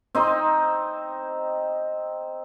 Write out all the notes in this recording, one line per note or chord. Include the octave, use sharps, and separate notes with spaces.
C4 D#4 D#5